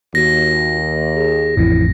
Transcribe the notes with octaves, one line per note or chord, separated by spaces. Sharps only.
D#2 F#4 A#6
G#4
A1 F2 E4